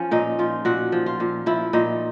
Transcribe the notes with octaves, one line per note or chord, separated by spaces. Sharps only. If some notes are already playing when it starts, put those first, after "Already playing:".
Already playing: F3 C#4
A#2 D#4
F3 F4
A#2 F#4
F3
F4
A#2
F3 E4
A#2 D#4